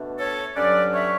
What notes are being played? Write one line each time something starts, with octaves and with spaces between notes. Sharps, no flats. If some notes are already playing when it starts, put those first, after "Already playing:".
Already playing: B2 A3 D4
A4 C#5
G2 D3 F#3 C#4 B4 D5
C#5 E5